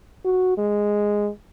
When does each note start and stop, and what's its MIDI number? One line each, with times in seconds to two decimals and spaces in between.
0.25 0.56 66
0.58 1.30 56